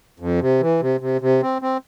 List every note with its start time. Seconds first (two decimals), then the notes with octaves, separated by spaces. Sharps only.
0.20 F2
0.41 C3
0.61 E3
0.81 C3
1.01 C3
1.21 C3
1.42 C4
1.62 C4